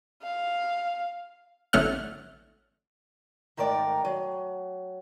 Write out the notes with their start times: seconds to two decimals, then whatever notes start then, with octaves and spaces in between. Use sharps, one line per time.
0.23 F5
1.73 A1 D3 F#3 A3 F#5 F6
3.57 G#2 D#3 A3 A#4 D5 G5
4.05 F#3